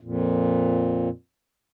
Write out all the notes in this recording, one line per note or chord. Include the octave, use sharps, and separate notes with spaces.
F2 A#2